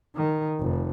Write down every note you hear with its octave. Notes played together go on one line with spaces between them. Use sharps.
D#3
F1